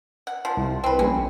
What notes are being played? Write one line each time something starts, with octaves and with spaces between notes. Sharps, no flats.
F#5
F3
C2
C4 B4
A#1 C#4